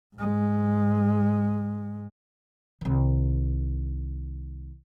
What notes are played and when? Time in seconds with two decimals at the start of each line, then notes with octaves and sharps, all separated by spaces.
0.15 G#2 G#3
2.81 C2 D#3